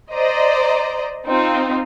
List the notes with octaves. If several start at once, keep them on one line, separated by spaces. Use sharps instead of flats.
C5 D5 D#5 A#5
C4 D#4 F4